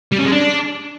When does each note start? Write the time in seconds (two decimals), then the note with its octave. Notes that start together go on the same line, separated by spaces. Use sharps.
0.12 G3
0.18 C#4
0.25 G#3
0.32 D4